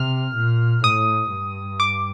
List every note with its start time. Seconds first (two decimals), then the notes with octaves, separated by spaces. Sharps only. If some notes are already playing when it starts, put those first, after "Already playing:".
Already playing: C3 F6
0.35 A#2
0.84 A2 D#6
1.32 G2
1.80 D6